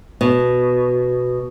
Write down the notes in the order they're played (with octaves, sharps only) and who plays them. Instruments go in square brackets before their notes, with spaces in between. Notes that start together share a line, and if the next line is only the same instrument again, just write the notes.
[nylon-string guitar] B2